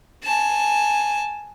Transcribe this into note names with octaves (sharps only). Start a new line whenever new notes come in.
G#5 A5